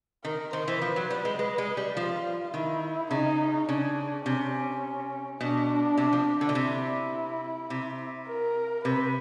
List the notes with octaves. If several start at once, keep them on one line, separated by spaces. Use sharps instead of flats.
D#3 A#4
D#3 C5
E3
F3 B4
F#3
G3
G#3
G#3
G#3
G3
F3 F4
D#3 E4
C#3 D#4
C#3 D4
C3 C#4
B2 D4
C3
F3
D3
B2
C3 E4
C3
A#4
C3 B4